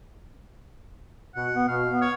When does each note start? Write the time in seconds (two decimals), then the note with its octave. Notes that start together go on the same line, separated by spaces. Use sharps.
1.35 B2 F#5
1.54 B3
1.68 B2 F5
1.89 B3
2.02 C#5